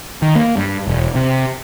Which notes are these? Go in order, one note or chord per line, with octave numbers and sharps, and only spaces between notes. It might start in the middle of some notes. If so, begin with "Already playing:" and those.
D#3
A#3
G2
E1
C3